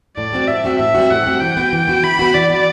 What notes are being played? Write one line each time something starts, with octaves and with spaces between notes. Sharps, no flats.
A2 D5
G3 C4 F#4
A2 E5
G3 C4 F#4
A2 E5
G3 C4 F#4
A2 F#5
G3 C4 F#4
E3 G5
B3 F#4
E3
B3 F#4
E3 B5
B3 F#4
E3 D5
B3 F#4